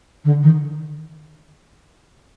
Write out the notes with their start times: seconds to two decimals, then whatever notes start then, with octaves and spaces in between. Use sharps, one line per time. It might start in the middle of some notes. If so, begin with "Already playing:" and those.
0.24 D3
0.43 D#3